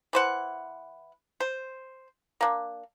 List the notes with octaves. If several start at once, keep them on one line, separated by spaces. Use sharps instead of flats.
E3 C5 F#5
C5
A#3 D4